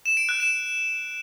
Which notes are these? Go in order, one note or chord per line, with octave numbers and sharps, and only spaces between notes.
E7
D7
F#6
E7